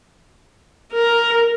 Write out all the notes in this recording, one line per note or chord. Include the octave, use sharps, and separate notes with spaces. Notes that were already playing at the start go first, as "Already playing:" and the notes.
A#4